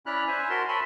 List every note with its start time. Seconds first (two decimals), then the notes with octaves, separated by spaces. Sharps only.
0.06 C#4 E4 D5 B5 F6 F#6
0.28 C5 E5 G#5
0.50 F#4 A#4 A5 C6
0.68 C#5 E5 G#5 A5 B5 C6